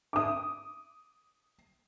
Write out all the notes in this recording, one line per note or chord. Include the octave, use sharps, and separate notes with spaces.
D6 D#6